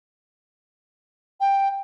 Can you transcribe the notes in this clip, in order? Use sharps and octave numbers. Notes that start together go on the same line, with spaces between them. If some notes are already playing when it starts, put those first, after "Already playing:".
G5